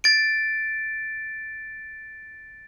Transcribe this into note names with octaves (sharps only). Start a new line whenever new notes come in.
A6 D7